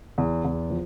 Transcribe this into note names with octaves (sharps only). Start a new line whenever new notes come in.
E2
E2
F3